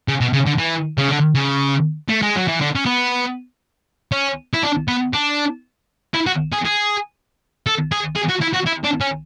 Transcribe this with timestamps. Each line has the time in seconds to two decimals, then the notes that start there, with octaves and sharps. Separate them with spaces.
0.08 C#3
0.21 B2
0.33 C#3
0.47 D3
0.59 E3
0.98 C#3
1.09 D3
1.35 C#3
2.09 A3
2.22 G#3
2.36 F#3
2.48 E3
2.60 D3
2.75 C#4
2.85 B3
4.12 C#4
4.54 E4
4.63 D4
4.88 B3
5.13 D4
6.14 E4
6.27 F#4
6.53 G#4
6.66 G#4
7.67 A4
7.92 G#4
8.16 G#4
8.29 F#4
8.42 E4
8.54 F#4
8.67 E4
8.84 D4
9.01 C#4